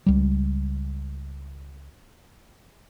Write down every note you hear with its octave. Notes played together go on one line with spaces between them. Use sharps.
C#2 G3